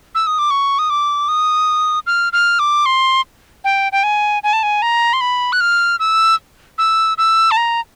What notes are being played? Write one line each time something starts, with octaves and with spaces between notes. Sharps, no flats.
E6
D#6
D6
C#6
D#6
D6
D#6
F6
F6
D6
C6
G5
G5
G#5
G#5
A5
G#5
A#5
C6
B5
F#6
F6
E6
E6
E6
A5
A#5